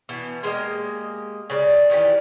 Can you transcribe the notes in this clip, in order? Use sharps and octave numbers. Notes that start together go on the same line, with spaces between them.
B2 E3
G#3 A#3 G4 D#5
C#3 B4 D5
D#3 E3 G4